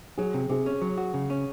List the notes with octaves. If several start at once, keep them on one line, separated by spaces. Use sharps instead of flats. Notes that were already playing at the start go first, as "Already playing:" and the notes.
F#3 G#4
C3
C3 G#4
C#4
F#3
F#4
C#3
C#4